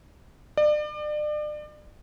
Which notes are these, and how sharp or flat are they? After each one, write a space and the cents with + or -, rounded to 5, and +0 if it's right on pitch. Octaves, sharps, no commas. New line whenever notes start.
D5 +35